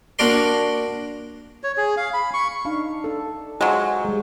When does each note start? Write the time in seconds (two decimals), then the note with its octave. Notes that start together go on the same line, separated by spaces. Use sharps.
0.19 A#3 D4 F#4 A#4 D5 C6
1.63 C#5
1.77 G#4
1.97 F5
2.13 B5
2.33 C#6
2.65 D4 D#4 F5
3.04 D4 A4
3.61 F#3 G#3 F4 C5 C#5
4.05 G3 G#3